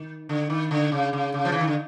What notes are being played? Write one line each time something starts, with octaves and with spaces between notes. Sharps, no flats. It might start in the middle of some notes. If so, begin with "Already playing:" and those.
Already playing: D#3
D3
D#3
D3
C#3
C#3
C#3
F3
E3
D#3
D3